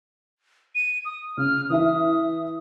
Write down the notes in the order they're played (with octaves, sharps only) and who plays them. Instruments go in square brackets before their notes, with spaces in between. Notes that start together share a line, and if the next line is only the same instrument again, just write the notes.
[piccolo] D#7
D#6
[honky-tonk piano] C#3 [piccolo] F6
[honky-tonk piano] E3 E4 E5 [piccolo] D#6